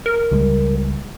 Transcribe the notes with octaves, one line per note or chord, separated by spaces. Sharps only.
A#4
C#2 G3 G#3